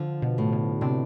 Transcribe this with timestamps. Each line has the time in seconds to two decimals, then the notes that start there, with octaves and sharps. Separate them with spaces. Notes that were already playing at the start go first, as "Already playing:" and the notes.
Already playing: D3 F3
0.22 B2
0.38 A2
0.53 B2
0.81 C3 D4